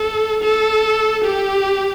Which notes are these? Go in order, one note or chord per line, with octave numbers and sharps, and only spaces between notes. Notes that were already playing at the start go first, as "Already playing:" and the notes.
Already playing: A4
A4
G4